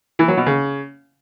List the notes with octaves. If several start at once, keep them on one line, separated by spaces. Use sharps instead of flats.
E3
F#3
B2
C#3